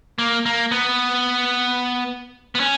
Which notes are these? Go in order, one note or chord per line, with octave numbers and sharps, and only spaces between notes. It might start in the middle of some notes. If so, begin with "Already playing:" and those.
A#3
A#3
B3
B3
C#4